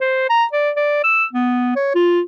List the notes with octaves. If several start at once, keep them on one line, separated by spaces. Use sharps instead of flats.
C5
A#5
D5
D5
E6
B3
C#5
F4